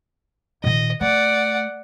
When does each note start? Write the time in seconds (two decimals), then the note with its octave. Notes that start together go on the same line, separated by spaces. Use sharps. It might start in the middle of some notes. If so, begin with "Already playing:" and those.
0.64 A#2 D#3 D#5
1.01 A3 D5 F#5